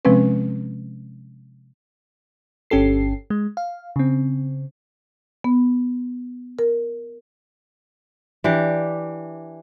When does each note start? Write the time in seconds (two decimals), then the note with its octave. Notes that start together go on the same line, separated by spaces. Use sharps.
0.05 C3 F3 G#3 C4 C#4 B4
2.70 G1 C#4 G4 A4 C7
3.30 G#3
3.57 F5
3.96 C#3 C4
5.44 B3
6.59 A#4
8.44 E3 D4 G4